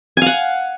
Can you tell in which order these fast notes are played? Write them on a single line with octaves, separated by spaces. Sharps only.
G#5 F5 F#5